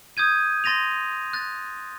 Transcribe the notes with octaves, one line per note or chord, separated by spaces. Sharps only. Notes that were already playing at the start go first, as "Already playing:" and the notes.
D#6 G6 G#6 D#7
C6 A6 A#6 D#7 F7
F#6 A6